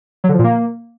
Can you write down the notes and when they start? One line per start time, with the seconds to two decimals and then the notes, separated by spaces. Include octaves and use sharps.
0.24 F#3
0.29 D3
0.34 F3
0.39 A#2
0.44 A#3